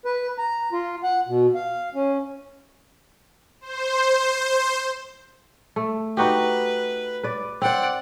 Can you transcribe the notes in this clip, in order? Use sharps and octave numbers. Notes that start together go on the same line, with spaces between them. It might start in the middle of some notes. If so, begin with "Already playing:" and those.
B4
A#5
F4
F#5
B2
F5
C#4
C5
A3
D#4 F#4 G4 B4
B4 D5
C4 C5 D5 F#5